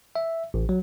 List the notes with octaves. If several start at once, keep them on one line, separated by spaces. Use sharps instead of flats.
E5
A1
F#3